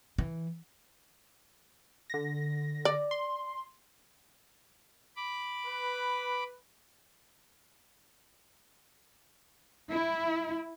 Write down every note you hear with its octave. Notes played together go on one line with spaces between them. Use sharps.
E3
D3 A#6
D5
C6
B5 D6
B4
E4